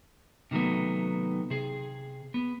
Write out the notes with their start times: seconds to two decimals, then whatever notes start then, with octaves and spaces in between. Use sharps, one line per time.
0.51 C3 D#3 F#3 A3 B3
1.50 C3 G#4
2.34 B3